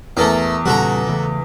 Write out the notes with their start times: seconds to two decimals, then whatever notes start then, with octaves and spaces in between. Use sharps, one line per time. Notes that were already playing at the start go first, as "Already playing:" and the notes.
0.17 E2 A3 A4 A#4
0.66 A#2 C#3 G3 F#4 A4 A#5
1.07 C#3 E3 A3